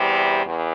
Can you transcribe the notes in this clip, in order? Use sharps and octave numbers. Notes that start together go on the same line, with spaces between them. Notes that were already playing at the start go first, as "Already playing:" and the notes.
Already playing: E2 C3 G3
E2